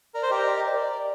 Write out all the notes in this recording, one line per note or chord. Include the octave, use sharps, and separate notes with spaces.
A#4 D5
C5
G4 A#4 D#5
D5
D#5
C5
D5